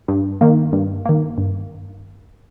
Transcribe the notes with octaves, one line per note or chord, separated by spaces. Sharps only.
G2
D#3 A#3
G2
D#3 A#3
G2